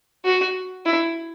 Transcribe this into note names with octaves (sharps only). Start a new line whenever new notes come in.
F#4
E4